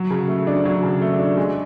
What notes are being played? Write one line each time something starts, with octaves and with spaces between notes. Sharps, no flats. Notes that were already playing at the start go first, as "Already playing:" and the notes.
Already playing: F#3
C#3
A3
D4
F#3
C#3
A3
D4
G#3